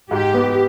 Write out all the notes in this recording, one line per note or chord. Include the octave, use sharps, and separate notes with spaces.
G#2 G4
B3